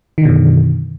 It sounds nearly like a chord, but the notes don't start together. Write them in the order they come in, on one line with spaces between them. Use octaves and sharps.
D#3 D3 B2 F#2